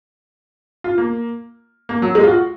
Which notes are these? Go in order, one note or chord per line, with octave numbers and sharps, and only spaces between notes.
F4
A#3
A#3
F#3
G#3
F4
F#4